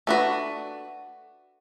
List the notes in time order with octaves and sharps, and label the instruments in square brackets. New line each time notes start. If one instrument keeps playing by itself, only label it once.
[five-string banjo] A3 D4 F#4 B4